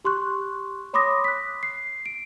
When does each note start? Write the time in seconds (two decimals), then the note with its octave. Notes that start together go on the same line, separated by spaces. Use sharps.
0.05 G4 C6 C#6 F#6
0.94 C#5 B5 C6 D6 D#6 A#6
1.24 F#6 B6
1.63 C7
2.06 D7